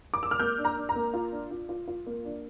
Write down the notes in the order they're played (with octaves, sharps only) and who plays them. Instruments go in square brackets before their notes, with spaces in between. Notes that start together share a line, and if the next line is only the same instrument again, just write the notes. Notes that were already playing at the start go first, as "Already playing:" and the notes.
[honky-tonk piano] D6
E6
F6
A#3 G6
D4
A#5
D4
A#5
A#3
F4
D4
F4
F4
F4
A#3
D4